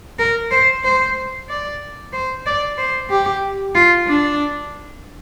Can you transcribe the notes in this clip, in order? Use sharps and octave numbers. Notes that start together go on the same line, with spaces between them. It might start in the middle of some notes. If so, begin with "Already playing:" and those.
A#4
C5
C5
D5
C5
D5
C5
G4
F4
D4